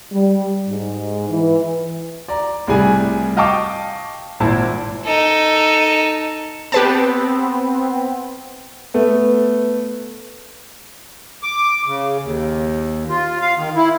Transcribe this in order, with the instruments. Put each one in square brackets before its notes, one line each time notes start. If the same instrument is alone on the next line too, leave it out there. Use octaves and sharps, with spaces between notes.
[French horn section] G3
G#2
E3
[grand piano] D5 A#5
C2 A2 C3 G3 G#4 G#5
D#5 F5 G5 A5 C#6 D6
G#1 A#2 E4 C5 A5
[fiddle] D#4 A4
[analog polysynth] B3 C4 [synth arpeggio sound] G4 B4 A5
[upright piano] A3 B3
[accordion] D6
C#3
D#2
F4
F5
D#3
E4